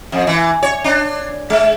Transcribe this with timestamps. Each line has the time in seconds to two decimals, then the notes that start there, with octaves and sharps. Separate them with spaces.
0.12 F2
0.27 E3
0.63 C#5
0.84 D4
1.50 G#3